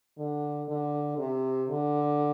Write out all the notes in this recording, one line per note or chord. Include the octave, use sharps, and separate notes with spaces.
D3
D3
C3
D3